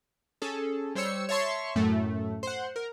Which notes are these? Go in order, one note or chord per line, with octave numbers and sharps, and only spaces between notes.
C#4 G#4 A4
G3 C5 C#5 E6 C#7
C#5 E5 A5 C6 C#6
F#2 A2 A3
C5 F#5
A#4